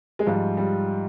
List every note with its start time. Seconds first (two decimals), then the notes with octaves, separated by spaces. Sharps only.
0.19 G#3
0.26 G#2 F3 G3
0.57 G3